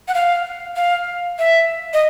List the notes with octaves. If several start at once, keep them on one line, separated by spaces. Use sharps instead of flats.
F#5
F5
F5
E5
D#5